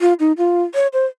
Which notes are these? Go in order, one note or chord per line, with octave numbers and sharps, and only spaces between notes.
F4
D#4
F4
C#5
C5